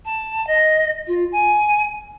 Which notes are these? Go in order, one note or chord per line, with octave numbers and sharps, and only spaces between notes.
A5
D#5
F4
G#5